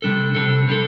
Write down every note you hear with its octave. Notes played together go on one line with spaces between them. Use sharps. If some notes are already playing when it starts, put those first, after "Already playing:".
C3 G3 D4 A4
C3 G3 D4 A4
C3 G3 D4 A4